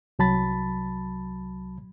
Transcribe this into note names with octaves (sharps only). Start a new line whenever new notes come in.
C2 F#3 A5 B5 A6